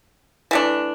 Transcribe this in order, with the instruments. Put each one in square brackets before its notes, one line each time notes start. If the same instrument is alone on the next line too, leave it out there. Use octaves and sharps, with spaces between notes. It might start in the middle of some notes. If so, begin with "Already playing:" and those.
[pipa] E3 A3 D4